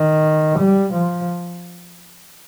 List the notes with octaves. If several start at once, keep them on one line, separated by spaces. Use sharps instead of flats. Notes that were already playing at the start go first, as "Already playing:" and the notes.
Already playing: D#3
G3
F3